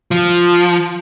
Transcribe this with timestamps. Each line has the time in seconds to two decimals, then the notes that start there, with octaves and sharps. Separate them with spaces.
0.11 F3